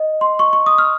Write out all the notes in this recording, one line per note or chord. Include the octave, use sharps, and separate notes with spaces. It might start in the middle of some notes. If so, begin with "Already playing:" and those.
Already playing: D#5
C6
C#6
C#6
D#6
F6